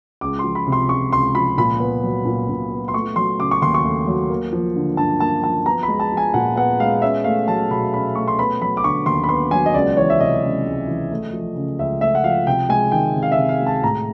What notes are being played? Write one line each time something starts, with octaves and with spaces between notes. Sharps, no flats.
C#2 D6
F3 C6
B5
C3
C6
C#2 C#6
C#2 C6
F3 B5
A#2 B5
B3
F#3
A#2
A#2
B3
C6
A3 C#6
F#3 C6
C#3 D6
C#6
D#2 C6
C#6
A3
F#3
A#3
F3
D3
G2 A5
A#3 A5
F3 A5
B3 A#5
B5
G#3
A5
F3
G#5
A#2 F#5
B3 F#5
G#3 F5
C#4 E5
A3 F5
F#3 A5
B2 B5
C#4 B5
A3 C#6
C6
B3 B5
F#3 B5
D6
D3 C#6
D#2 C6
B5
B3 C6
F#3 G#5
D#5
C#2 D5
E3 C#5
E5
C3 D#5
C#2
C#2
E3
A3
F3
C#3
C#2 E5
A3 E5
F#5
F3 F5
C3 G5
G#3 G#5
D#3 G5
C3
F5
E5
C3
F5
G#3
A5
A2 A#5